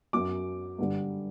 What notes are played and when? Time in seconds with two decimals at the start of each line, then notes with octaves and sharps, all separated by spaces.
0.13 F#2 F#3 D6
0.79 G2 D3 G3